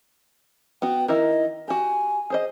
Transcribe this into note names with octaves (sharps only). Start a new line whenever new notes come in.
B3 F#4 G5
D#3 E4 A#4 D#5
F#4 G4 G#5
G#4 C5 D#5